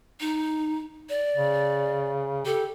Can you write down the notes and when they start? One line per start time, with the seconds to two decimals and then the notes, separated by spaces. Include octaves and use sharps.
0.20 D#4
1.09 D5
1.36 C#3
2.46 G4 A4